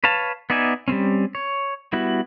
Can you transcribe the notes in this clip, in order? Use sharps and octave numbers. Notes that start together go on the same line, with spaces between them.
B4 C#5 F5 A5
B3 D#4 D5 E5 G#5
G3 G#3 C4 C#4
C#5
G3 B3 E4 F#4